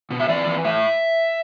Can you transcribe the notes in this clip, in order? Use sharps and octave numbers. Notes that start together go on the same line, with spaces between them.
B2
E5
E3 D5
E3
A2 E5